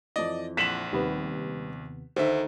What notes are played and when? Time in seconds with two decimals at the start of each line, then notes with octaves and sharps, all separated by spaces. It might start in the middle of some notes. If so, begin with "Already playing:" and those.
0.16 F2 E3 D5 D#5
0.57 A#1 F#5 C6 B6 E7 F#7
0.93 D#2 C3 G3 B3 B4
2.16 D2 D#3 A3 D#4 C5 E5